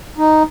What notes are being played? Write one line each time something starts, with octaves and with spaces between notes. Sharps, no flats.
D#4